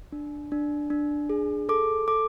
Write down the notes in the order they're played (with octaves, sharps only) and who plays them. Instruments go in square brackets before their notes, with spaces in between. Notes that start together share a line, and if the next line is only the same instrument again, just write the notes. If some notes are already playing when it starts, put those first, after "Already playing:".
[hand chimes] D4
D4
D4
G#4
A4 D6
A4 D6